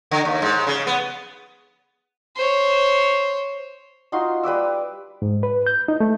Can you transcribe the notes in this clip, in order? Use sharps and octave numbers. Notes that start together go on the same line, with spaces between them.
D3
D#2
G#2
C#3
B3
C5 C#5
D#4 F4 F#4 C6
G3 B4 D6 E6
G#2
B4
G6
D#4
A3